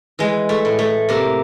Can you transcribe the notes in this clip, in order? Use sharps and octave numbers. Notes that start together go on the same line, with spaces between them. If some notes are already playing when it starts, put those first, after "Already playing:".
E3 G#3
A3
A2
A3
C3 A#3